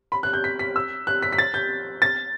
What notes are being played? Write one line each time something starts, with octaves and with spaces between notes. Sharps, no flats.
B5
F#6
G6
B6
B6
E6
F#6
B6
B6
A6
G6
A6